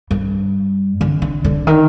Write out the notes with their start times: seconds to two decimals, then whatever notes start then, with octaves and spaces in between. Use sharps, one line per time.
0.11 G2
1.01 D3
1.22 D3
1.44 D3
1.67 D#3